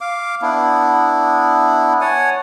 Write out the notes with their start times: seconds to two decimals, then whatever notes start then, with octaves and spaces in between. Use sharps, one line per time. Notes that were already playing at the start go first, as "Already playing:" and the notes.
0.01 F5 D6
0.42 B3 D4 E4
2.01 C#5 F#5 G#5 A5